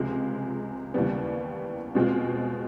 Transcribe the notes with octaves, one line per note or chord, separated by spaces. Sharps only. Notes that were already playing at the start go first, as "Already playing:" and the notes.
Already playing: C#2 C3 F3 G#3
D#2 C#3 E3 G3 B3
B2 G#3 C4 F4